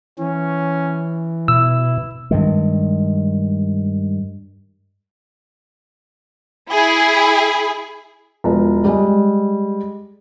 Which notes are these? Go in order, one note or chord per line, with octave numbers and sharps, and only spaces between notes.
E3 C#4
B2 E4 E6
G2 D#3 G#3
E4 G#4
E1 F3
G3 G#3